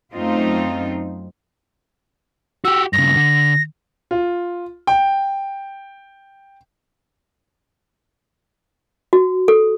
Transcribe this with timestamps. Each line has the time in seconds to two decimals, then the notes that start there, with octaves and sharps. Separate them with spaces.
0.12 F#2 A3 C4 D#4 F4
2.65 F#4 G4 E6
2.93 G2 C#3 A#6
3.16 D3
4.11 F4
4.87 G5
9.13 F#4
9.48 A4